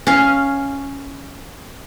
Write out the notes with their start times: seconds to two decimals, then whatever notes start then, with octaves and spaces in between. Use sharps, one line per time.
0.07 C#4 F5